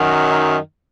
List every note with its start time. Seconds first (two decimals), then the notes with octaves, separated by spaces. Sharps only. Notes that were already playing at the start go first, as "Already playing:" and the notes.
Already playing: F#2 D#3 F#3
0.30 D#4